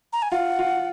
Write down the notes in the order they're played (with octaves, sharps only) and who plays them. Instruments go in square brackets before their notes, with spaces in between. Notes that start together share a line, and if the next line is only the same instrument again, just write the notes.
[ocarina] A#5
G#5
[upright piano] F4 [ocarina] F#5
[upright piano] F4